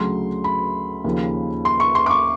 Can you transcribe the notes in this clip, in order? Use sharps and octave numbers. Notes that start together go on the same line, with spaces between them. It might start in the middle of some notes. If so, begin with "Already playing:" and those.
Already playing: D2 C#3 F#3 C6
B5
D#2 C#3 F3
C6
C#6
C6
D6
C#6